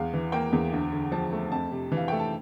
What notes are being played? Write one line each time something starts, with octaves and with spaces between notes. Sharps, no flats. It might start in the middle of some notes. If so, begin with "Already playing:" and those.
Already playing: E2 F5
E3
A#3 G5
E2
D2
D3
F3 A5
A3
F2 A5
C3
E3
F5
A3 G5
A5